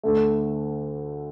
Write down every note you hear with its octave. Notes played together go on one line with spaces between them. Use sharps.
D2 D3 A3